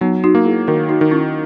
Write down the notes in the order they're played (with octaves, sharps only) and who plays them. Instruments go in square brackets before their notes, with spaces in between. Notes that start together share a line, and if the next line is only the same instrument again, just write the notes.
[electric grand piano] F#3 [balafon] B3 D#4
[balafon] D#4 F#4
[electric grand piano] A#3
[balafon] E4 G#4
[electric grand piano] D#3 [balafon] F#4 A#4
[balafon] D#4 F#4
[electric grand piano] D#3
[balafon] C#4 E4